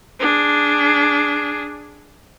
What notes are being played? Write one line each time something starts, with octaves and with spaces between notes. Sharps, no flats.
D4 G#4